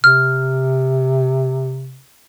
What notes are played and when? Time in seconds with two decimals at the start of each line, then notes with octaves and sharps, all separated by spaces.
0.04 C3 F6